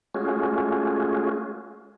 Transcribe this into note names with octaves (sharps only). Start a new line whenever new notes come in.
G#3 A3 C#4 F4 F#4 G#4